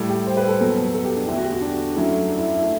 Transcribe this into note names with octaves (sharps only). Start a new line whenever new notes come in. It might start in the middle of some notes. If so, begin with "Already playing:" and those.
Already playing: A2 G3 A4
G4
C5
B4
A4
E2 B2 F#3
A4
G4
D4
E2 D3 A3 E4
F#4
G4
F#4
D4
F#2 F#3 A3 E4
D4
E4
E4
A3